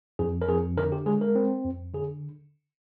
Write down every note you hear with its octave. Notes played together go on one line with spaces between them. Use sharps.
F2 G#4
A#4
F2 G#4
D3 A#4
G4
G#3 G#4
A#4
C4
F2
D3 G#4